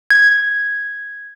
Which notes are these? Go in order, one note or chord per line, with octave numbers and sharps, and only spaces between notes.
G#6